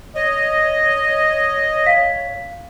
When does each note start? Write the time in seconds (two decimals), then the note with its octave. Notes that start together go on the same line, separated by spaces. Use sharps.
0.15 C#5 D#5
1.86 F5 B6